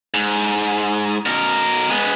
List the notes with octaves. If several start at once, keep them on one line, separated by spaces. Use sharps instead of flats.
G#2
B2 A#4
G#3 B3